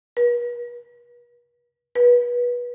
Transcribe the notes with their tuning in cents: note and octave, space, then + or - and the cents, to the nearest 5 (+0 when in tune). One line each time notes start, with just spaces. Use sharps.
B4 -45
B4 -25